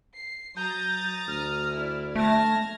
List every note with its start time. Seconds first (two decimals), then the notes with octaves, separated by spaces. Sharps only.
0.14 C7
0.56 F#3 A#5 D#6 G6 A6
1.27 D2 F6
1.74 E4 D5
2.15 A3 A5 F6 G#6 A#6